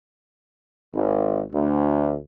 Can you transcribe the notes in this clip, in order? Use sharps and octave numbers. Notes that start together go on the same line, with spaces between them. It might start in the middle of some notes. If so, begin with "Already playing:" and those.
G#1
D2